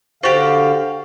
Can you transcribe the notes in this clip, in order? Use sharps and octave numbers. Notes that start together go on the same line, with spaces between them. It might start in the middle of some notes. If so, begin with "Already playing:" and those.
D3 F#4 G4 C5 F5 A6